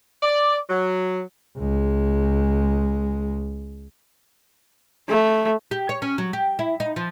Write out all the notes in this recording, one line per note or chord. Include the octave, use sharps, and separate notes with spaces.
D5
F#3
C#2 G#3
A3
G4
C#5
C#4
F#3
G4
E4
D#4
F3